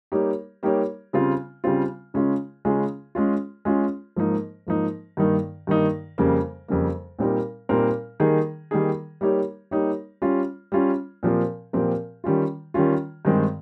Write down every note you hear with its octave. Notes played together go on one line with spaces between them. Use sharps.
G3 A#3 D#4 G4 C#5
G3 A#3 D#4 G4 C#5
C#3 G3 C4 F4
C#3 G3 C4 F4
C#3 G#3 C#4 F4 G#4
C#3 G#3 C#4 F4 G#4
G#3 C#4 F4
G#3 C#4 F4
G#2 F3 A#3 D#4
G#2 F3 A#3 D#4
G2 D#3 A#3 D#4
G2 D#3 A#3 D#4
F2 C#3 G3 A#3
F2 C#3 G3 A#3
A#2 G3 C4 D#4 A#4
A#2 G3 C4 D#4 A#4
D#3 G3 A#3 D#4 G#4
D#3 G3 A#3 D#4 G#4
G3 A#3 D#4 G4 C#5
G3 A#3 D#4 G4 C#5
G3 C#4 F4
G3 C#4 F4
A#2 F3 C4 G4 A#4
A#2 F3 C4 G4 A#4
D#3 G3 C#4 F4
D#3 G3 C#4 F4
G2 D#3 G#3 C4